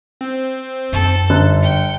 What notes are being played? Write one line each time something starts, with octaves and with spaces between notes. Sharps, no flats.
C4
F#2 D#4 A4
G1 F#6
G5 C#7